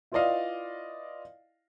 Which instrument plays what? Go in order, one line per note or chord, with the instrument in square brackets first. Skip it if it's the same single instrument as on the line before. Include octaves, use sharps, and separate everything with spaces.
[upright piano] E4 F4 B4 D5 D#5 F5